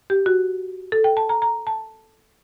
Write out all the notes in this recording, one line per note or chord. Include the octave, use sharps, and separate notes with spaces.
G4
F#4
A4
G5
A5
A#5
A#5
A5